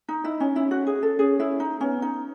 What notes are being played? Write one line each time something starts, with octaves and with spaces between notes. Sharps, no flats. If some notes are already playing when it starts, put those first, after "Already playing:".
D#4
D#4 E4
C#4
C#4 E4
F#4
G#4
A4
C#4 G#4
E4
D#4
B3 C#4
D#4